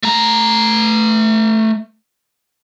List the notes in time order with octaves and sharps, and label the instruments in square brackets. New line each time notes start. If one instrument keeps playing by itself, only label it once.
[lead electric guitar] A3 A#5